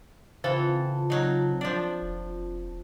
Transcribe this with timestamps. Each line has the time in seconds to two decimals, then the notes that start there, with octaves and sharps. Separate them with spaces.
0.44 C#3 E3 C4 F4 A4 A5
1.10 F#3 D#4
1.61 F3 D4
2.02 F1